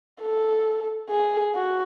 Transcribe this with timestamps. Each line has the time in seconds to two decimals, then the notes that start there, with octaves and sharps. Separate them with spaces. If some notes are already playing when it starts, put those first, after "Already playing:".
0.22 A4
1.10 G#4
1.55 F#4